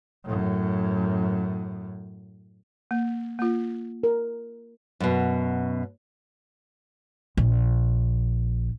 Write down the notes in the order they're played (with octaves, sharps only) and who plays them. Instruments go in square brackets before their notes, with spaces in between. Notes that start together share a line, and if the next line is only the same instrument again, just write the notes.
[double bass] F#2 A2
[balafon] A#3
A#3 F4
[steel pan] A#4
[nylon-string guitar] F#2 B2
[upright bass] A#1